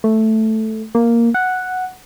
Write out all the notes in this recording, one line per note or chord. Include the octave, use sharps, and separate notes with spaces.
A3
A#3
F#5